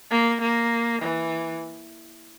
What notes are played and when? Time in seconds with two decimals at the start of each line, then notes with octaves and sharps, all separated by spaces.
0.11 A#3
0.41 A#3
1.02 E3